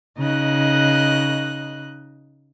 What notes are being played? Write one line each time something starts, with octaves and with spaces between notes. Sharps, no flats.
C#3 D#4 D#5 F#6